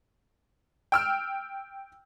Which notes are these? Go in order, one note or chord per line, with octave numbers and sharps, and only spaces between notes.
G5 E6 F6